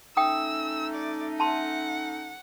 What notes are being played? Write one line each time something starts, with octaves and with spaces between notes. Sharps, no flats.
A3 C#4 D#4 G5 D#6 E6
D5
F#5 A5 C6